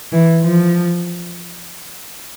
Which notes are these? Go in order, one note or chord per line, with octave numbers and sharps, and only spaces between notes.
E3
F3